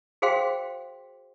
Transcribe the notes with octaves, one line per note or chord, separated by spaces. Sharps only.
F#4 G#4 C5 F5 G5 C6